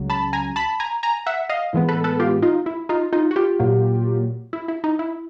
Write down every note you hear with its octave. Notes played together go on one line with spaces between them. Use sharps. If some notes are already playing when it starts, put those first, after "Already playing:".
Already playing: C#2 C#3 F#3
A5 B5
G#5 A#5
A5 B5
G#5 A#5
G#5 A#5
E5 F#5
D#5 F5
A2 E3 G#3 B3
A4 B4
A4 B4
F4 G4
D#4 F4
E4
D#4 F4
D#4 F4
F#4
F4 G4
A#2 F#3 A#3
E4
E4
D#4
E4